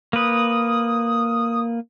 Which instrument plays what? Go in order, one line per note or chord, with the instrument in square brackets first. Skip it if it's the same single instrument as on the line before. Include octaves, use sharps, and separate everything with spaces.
[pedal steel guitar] A#3 B4 [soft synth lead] D#6